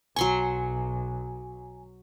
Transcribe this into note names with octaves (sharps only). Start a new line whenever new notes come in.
B1 F#3 G#5 C6 C#6